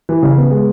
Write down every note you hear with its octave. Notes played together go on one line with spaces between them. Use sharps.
E3
C#3
B3
G#3